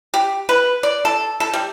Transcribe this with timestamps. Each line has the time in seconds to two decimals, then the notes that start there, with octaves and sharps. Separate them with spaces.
0.14 G4
0.49 B4
0.83 D5
1.05 A4
1.40 A4
1.53 G3